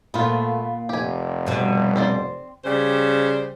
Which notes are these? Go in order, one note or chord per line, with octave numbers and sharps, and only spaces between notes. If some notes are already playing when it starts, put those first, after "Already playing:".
A#2 A3 B3 F4
F1 G4 G#5
G2 B2
C4 C5 D5
C#3 G3 C5